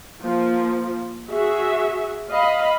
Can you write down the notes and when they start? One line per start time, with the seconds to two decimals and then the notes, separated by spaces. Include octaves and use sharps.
0.22 F3 A#3
1.30 F#4 G#4 E5
2.31 D#5 F5 B5